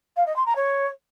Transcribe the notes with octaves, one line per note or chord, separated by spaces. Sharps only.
F5
D#5
C6
A#5
C#5